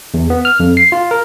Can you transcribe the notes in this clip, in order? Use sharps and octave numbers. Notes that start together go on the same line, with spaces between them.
E2
B3
F6
F2
C7
F4
A#4